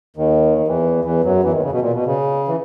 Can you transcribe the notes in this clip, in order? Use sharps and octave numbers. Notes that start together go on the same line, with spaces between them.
D#2 D#3
D#3
E2 E3
E2 E3
F#2 F#3
E2 E3
D#2 D#3
C#3
B2
A#2
B2
C#3
E3